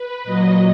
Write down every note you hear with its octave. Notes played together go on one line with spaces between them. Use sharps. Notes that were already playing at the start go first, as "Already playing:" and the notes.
Already playing: B4
A#2 F#3 D#5